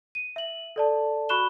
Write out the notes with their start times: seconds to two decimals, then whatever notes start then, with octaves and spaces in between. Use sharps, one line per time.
0.15 D#7
0.36 E5 F#7
0.76 A4 D5 A5
1.29 F#4 B5 C#6 F#6 E7 G7